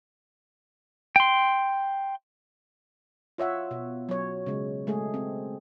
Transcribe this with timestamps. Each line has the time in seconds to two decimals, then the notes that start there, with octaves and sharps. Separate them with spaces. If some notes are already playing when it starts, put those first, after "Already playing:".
1.16 G5 C6
3.38 F4 C#5 E5 F#5
3.71 B2
4.09 F#3 C#5
4.46 C#3 G#3
4.87 G#3 A3 G#4
5.14 C4